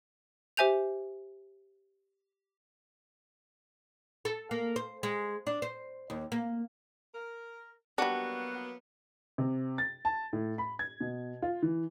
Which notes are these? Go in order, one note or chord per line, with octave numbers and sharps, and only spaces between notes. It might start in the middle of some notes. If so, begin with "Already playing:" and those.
G4 C5 E5 G#5 G6 F7
A4
A#3
C5
G#3
D4
C5
D#2
A#3
A#4
F#3 G3 A#3 B3 D4 F#4
C3
A6
A5
A2
B5
G#6
B2
F4
E3